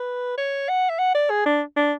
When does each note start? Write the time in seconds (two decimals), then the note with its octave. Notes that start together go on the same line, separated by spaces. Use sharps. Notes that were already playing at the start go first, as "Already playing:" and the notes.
Already playing: B4
0.37 C#5
0.69 F#5
0.90 E5
0.99 F#5
1.14 D5
1.30 G#4
1.46 D4
1.76 D4